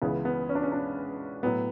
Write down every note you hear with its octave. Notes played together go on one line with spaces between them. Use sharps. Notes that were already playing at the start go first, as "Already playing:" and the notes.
C#2 C#3 E3 B3
B3
C#4
D4
C#4
D4
A2 F#3 B3